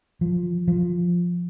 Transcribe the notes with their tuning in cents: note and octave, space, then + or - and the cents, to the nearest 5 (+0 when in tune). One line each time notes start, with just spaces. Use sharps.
F3 +10
F3 +5